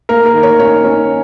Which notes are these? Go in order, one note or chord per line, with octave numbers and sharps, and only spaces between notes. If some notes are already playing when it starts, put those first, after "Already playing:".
A#3 A#4
A#4
D#3
C#5
C#4 C#5
C#4